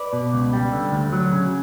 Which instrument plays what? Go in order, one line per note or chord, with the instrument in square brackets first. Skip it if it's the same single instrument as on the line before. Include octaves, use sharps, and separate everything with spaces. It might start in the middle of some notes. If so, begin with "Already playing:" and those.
Already playing: [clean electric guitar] B4 D5
B2
C#2
G3
D3
D2
F#3
C#3